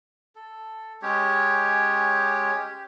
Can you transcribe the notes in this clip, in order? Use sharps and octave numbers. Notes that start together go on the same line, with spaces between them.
A4
G#3 C#4 G4 C#5
G4